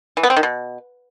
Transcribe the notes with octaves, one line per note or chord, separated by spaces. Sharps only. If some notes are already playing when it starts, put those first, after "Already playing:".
E3
B3
C4
D#3
B2